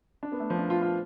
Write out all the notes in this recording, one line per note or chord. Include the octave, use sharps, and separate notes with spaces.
D4
B3
A3
F3
D4
F4
F4